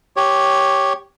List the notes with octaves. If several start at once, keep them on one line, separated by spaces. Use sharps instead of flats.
G4 C#5